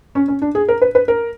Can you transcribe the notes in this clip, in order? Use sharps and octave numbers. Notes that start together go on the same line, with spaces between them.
C#4
C#4
D4
G#4
A#4
B4
B4
A#4